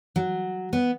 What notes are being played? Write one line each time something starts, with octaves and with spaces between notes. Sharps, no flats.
F#3
B3